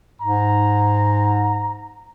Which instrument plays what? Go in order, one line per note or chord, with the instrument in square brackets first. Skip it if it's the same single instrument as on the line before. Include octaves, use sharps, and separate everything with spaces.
[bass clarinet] G#2 [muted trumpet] A#5